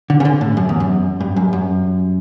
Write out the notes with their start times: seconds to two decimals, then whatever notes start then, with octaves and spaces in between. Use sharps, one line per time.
0.10 D3
0.20 C#3
0.25 D3
0.41 A2
0.57 F#2
0.69 E2
0.80 F#2
1.21 G2
1.36 F#2
1.53 F#2